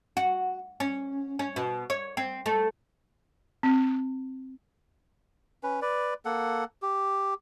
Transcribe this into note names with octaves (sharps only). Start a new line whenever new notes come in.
F#4
C#4
C#4
B2
C#5
C4
A3
C4
C#4 B4
B4 D5
A#3 A4 F#5
G4